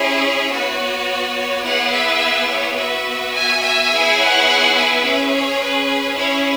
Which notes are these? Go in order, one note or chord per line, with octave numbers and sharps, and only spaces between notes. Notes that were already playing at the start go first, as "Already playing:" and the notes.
Already playing: C#4 E4 G#4 C#5
B3 F#4
C#5
C#5
B3 E4 G#4 C#5 F#5
B4 E5
C#5
B3 F#4 B4 E5
E5 G#5
E5 G#5
B3 E4 G#4
C#5 F#5
B4 E5
C#4 G#4
C#5
B4
C#4 E4 G#4 C#5